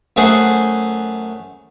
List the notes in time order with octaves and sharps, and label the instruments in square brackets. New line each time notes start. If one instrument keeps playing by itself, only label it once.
[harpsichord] F#2 A3 G#4 C5 F#5